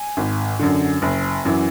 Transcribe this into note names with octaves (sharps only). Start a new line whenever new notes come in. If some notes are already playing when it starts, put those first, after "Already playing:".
Already playing: G#5
G#1
F#2 D3
F#1
F#2 E3